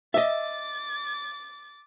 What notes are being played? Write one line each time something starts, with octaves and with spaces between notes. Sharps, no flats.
D#5 E5 D6 A6